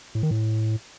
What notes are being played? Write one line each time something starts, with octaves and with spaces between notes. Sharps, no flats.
A2
D#3
A2